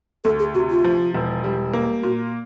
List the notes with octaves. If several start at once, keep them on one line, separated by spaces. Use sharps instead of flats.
D2 A4
G#4
C3 F#4
F4
F3
E1
G3
A#3
A#2 F#4